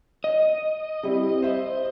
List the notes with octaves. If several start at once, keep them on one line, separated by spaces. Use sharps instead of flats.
D#5
G3 C4 E4
C5 E5